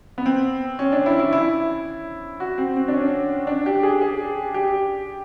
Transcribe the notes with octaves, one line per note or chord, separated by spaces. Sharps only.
B3
C4
C#4
D4
E4
E4
E4
F#4
C4
C4
D4
C#4
D4
G4
G#4
G#4
G4